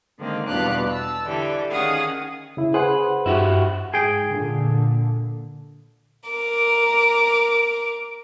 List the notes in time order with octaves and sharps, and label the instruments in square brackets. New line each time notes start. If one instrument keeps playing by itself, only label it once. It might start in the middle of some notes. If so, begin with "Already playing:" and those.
[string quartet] D3 D#3 G#3 A#3 C4
E2 B2 G3 D4 F5 F#6
A5 E6
D3 E3 G3 A4
D#3 C#4 G#4 F5 F#5 D#6
[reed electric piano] C#3 E4
[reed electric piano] G#4 C5 F#5 [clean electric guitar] B4
[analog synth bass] G2 [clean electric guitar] E4 F#4 G4
[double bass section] G#2 [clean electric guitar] G#4 G5
[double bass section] A#2 D3
[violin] A#4 D6